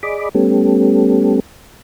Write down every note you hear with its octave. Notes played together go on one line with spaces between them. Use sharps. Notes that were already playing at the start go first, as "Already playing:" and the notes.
G#4 D5 D#5 B5 D6
G3 A3 B3 C#4 G4 A4